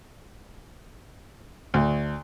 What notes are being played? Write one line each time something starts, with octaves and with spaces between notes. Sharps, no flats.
D2